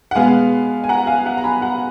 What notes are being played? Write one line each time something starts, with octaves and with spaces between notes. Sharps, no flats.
F#5
B2 G#3 B3 F5 G#5
G#5
F#5 A#5
F5 G#5
F#5 A#5
A#5
G#5 B5
F#5 A#5